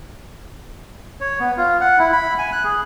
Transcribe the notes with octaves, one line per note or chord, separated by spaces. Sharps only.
C#5
B3
F4
F#5
E4
B5
G#5
F#6
G#4